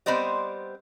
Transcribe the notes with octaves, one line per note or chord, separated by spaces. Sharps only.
G3 B3 C4 C5 D5 D#5